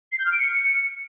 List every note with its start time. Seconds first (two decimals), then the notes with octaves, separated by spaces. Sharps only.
0.12 C7
0.18 G6
0.25 F6
0.32 D7
0.39 C#7